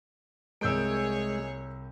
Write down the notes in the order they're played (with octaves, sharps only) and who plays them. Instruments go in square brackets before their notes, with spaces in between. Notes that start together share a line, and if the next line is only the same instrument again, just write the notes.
[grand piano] C2 A#4 [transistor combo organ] G#3 [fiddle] G#4 C#5 [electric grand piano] E6 G6 D7